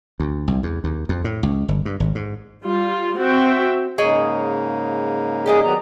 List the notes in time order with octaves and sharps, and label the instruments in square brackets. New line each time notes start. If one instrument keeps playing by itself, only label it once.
[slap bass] D2
C2
E2
D#2
F2
A2
C#2
G1
G2
G#1
G#2
[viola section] G3 F4
C4 F#4 E5 G5
[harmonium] G#2 C#3 A#3 [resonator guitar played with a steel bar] G#4 C#5 D#5
[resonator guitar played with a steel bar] G4 D5 D#5 [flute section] G#4
[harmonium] D#3 F#3 B3 [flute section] A#5